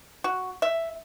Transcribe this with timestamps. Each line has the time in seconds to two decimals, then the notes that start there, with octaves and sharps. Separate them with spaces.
0.24 F#4
0.62 E5